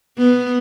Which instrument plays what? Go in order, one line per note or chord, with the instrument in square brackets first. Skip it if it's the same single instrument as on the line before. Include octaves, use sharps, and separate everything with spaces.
[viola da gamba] B3